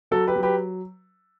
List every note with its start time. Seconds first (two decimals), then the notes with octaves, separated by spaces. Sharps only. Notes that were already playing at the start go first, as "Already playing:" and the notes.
0.11 F#3 F#4 A4
0.27 G4 B4
0.36 F#3
0.43 G4 B4